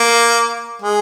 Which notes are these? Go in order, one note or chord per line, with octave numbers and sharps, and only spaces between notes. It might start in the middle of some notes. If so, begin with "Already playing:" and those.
Already playing: A#3
G#3